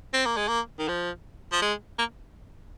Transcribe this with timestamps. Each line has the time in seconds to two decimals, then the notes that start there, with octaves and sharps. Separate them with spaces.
0.13 C4
0.25 A#3
0.36 G#3
0.48 A#3
0.79 D#3
0.88 F3
1.52 F3
1.62 G#3
1.98 A#3